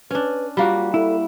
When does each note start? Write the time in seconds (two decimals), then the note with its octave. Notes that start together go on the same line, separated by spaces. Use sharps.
0.11 C#4 D4 B4
0.57 G3 A#3 F4 F#4
0.94 E4 A4